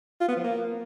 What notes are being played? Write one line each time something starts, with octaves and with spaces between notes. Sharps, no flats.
F4
B3
F3
A#3